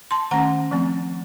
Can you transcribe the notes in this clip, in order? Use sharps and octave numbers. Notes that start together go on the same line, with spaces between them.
A5 C6
D#3 A3 C#4 F#5 A#5
F3 A3 C4